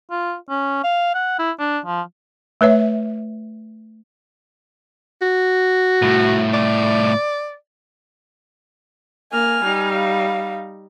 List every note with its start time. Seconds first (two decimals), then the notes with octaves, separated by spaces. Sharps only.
0.11 F4
0.50 C#4
0.84 F5
1.15 F#5
1.39 E4
1.59 D4
1.86 F3
2.61 A3 B4 C#5 E5
5.22 F#4
6.02 C2 A2
6.54 D5
9.32 A#3 G#5 F6
9.62 G3 D#4
9.94 F5